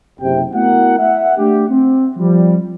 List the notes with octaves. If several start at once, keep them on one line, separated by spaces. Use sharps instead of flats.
F#1 C3 G5
A3 B3 E4 F#4 A#4 F#5
E5 F#5
A3 D4 G4
C4
F3 G3